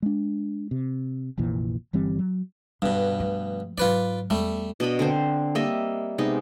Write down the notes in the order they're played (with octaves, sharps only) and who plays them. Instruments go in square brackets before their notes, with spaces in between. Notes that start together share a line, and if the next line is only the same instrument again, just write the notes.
[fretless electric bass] G#3 D4
C3
F1 A#1 A#2 E3
G1 E3 G3 C4
F#3
[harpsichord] G2 B2 [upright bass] D3
[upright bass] F3 A3
[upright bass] G#2 F#3 [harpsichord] F4 B4 D5
[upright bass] E2 [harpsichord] G3 A3
[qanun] B2 D4 D#5 B5
D3 C4 C5
G3 A#3 D#5 E5
C3 G#3 B3 D#4